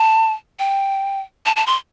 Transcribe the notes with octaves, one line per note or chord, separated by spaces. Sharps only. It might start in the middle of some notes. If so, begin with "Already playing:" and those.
Already playing: A5
G5
A5
A5
C6